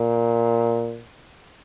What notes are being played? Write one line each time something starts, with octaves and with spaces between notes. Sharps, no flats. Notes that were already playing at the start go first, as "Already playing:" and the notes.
Already playing: A#2